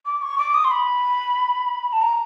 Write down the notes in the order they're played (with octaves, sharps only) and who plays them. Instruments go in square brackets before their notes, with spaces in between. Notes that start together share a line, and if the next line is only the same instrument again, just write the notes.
[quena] D6
C#6
D6
D#6
C6
B5
A5
A#5